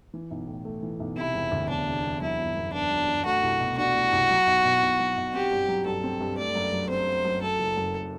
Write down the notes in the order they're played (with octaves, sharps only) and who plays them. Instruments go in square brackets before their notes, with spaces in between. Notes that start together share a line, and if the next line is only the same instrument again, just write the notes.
[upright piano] E3
B1
A2
A3
E3
B1
[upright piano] C3 [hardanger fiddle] E4
[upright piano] E1
D2
[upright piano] E1 [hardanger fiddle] D4
[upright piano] C3
E1
[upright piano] F#3 [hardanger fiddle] E4
[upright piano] G1
F#2
[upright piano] B3 [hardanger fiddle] D4
[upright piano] F#3
G1
[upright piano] A3 [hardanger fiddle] F#4
[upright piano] C2
B2
[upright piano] D4 [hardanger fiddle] F#4
[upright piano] A3
C2
F#3
B1
B2
B1
F#3
B1
[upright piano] C4 [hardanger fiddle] G4
[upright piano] G2
F#3
[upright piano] G2 [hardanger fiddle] A4
[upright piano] C4
G2
[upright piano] A3 [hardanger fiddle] D5
[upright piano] F#2
F#3
[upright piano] C4 [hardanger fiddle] C5
[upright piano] A3
F#2
[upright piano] F#3 [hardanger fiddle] A4
[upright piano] F#1
F#2